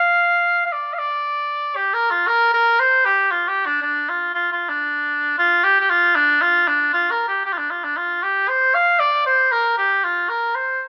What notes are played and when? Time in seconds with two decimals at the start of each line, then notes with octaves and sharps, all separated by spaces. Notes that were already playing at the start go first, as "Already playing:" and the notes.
Already playing: F5
0.66 F5
0.72 D5
0.94 F5
0.99 D5
1.76 G4
1.94 A#4
2.11 F4
2.28 A#4
2.54 A#4
2.79 C5
3.05 G4
3.31 F4
3.48 G4
3.66 D4
3.83 D4
4.09 F4
4.35 F4
4.52 F4
4.69 D4
5.38 F4
5.64 G4
5.81 G4
5.90 F4
6.16 D4
6.42 F4
6.68 D4
6.93 F4
7.11 A#4
7.28 G4
7.45 G4
7.53 F4
7.58 D4
7.71 F4
7.84 D4
7.97 F4
8.23 G4
8.48 C5
8.74 F5
9.00 D5
9.26 C5
9.52 A#4
9.78 G4
10.04 F4
10.29 A#4
10.55 C5